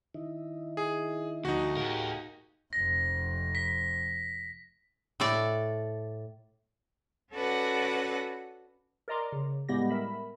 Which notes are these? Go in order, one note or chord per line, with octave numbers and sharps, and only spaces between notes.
D#3 D#4 E4
G#4
D2 F3 D#4 F#4
A2 G4 G#4 A#4 F5
F1 F2 A#6
B6
A2 A4 D5
C#4 F#4 A4 B4 D5 F#5
A#4 D5 D#5 A#5 C6 D6
C#3
A2 G3 G#3 B3 G4 A#6
A#4 E5 B5